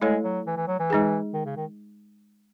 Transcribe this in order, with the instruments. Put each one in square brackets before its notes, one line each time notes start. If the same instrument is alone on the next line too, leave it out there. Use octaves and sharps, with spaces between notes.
[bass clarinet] G#3 [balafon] A3 E4 A4 C#5
[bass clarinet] F#3
E3
E3
F#3
E3
[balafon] G#3 D#4 G#4
[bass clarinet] D#3
C#3
D#3